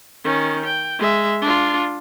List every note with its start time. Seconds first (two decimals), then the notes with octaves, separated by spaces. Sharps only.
0.24 D#3 C#4
0.66 G5
0.99 G#3 E5
1.42 D4 F4